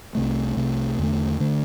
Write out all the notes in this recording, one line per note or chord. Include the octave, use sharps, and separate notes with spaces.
C2 C3 A3
C2 C3 A3
E2 D3 A3
D3 A3